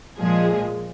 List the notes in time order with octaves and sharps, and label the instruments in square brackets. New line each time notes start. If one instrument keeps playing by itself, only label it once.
[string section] A#2 F3 G#3 G#4